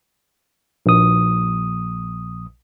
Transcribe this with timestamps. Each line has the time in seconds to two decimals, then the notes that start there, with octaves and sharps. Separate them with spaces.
0.86 A#1 D#6